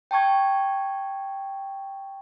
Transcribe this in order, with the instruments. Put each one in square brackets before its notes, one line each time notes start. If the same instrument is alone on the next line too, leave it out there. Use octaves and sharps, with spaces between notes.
[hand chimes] G5 A5 C#6 G#6